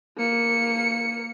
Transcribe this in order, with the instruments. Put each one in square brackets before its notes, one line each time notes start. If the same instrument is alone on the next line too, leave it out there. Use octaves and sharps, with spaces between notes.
[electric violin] A#3 C#7